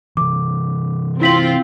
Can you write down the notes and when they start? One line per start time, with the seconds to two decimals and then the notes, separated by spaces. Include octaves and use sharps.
0.17 C3 E3 D6
1.21 C4 E4 F4 B6 F#7